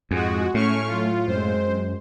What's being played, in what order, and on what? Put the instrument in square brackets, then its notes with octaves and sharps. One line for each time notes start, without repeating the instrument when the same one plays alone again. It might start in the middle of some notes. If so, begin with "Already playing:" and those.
[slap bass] F2 [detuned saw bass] G#2 [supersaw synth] G#3 F#4
[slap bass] A2 [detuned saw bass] A3 [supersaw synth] C#4 C#6 F6
[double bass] F#3 [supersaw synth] F4
[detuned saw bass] F#2 [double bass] G#3 C4 [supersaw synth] C5